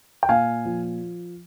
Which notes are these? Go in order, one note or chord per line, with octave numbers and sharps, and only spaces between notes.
G5
A#2 F5 G#5
F3